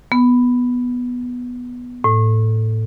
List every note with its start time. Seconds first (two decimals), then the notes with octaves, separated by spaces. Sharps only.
0.12 B3
2.04 A2